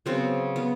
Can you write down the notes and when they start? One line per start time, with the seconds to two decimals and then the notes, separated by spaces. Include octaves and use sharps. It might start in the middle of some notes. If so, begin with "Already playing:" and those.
0.06 C#3 F#3 B3 C4
0.56 B3